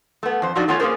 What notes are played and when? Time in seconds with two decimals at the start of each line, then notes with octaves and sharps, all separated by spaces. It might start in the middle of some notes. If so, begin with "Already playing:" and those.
0.23 A3 B3
0.42 F2 C5
0.55 F3 F#3 D4 D#4 F#4 D5
0.68 A3 B3 C#4 F4 C#5
0.80 A#3 B3 C#4 G#4 A#4 C5